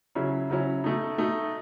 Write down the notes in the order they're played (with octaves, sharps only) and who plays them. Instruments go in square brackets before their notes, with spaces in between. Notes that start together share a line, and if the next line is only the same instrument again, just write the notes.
[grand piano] C#3 F#3 C#4 E4
C#3 F#3 C#4 E4
B2 A3 D#4
B2 A3 D#4